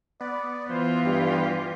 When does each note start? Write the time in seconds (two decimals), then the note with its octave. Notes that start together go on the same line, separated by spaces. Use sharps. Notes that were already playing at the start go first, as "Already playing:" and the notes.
0.21 B3 D5
0.69 E3 F4 C5
1.05 G2 G4